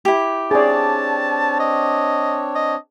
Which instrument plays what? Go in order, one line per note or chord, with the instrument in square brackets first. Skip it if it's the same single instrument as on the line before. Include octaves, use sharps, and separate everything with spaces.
[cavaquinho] E4 G4
[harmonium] C4 D4 C#5 [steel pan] G#4 D5 [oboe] A5
[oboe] D#5
D#5